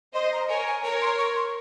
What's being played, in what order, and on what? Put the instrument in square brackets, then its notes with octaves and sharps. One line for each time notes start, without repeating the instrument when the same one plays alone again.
[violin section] C5 D#5 [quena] C6
[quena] A#5
[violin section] A#4 C#5 [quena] G#5
[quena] G#5
[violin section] A#4 C#5 [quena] A#5
[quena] C6
C#6
C6